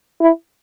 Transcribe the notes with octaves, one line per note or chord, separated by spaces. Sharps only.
E4